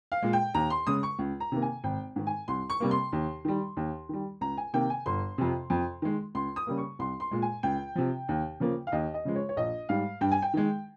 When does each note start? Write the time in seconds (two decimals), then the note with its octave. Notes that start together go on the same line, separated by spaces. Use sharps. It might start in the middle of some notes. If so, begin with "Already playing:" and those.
0.12 F5
0.22 A#2 G#3
0.33 G5
0.54 D#2 A#5
0.70 C6
0.87 C#3 G#3 D#6
1.03 C#6
1.19 C#2
1.40 A#5
1.52 C3 D#3 A#3
1.62 G#5
1.84 G#1 G5
2.16 G#2 D#3
2.27 G#5
2.48 C2 C6
2.70 C#6
2.80 C3 G3 A#3
2.91 C6
3.12 D#2
3.45 D#3 G3
3.77 D#2
4.09 D#3 G3
4.41 C#2 A#5
4.57 G#5
4.74 C3 D#3 A#3 G5
4.90 G#5
5.06 G1 C6
5.38 F2 C3
5.70 F2
6.02 D#3 G#3
6.35 C#2 C6
6.56 D#6
6.67 C#3 G3 A#3
6.78 C#6
6.99 C2 C6
7.20 C6
7.31 A#2 G#3
7.42 G#5
7.63 C#2 G5
7.95 C3 F3
8.29 D#2
8.60 C#3 F3 A#3
8.87 F5
8.92 D#2 D#5
9.14 D#5
9.25 C#3 F3 G#3
9.36 C#5
9.49 C#5
9.57 A#1 D#5
9.89 G#2 G3 F5
10.21 G2 G5
10.32 G#5
10.42 G5
10.54 D#3 G#3